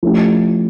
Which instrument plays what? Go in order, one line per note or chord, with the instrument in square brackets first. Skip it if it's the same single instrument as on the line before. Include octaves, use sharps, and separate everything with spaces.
[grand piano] F3 A3 C#4 E4 G4